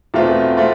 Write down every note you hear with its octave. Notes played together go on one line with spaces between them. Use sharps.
E2 B2 A3 C4 F4
A3 C4 F4